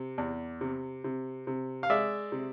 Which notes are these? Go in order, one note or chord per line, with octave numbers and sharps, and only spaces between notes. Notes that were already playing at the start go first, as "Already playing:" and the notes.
Already playing: C3
E2
C3
C3
C3
F5
G#3 D5 E5
C3